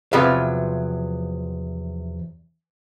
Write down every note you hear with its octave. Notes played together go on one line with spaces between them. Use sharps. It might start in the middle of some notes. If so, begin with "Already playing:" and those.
E2 C3 F3 F#3 B4 F5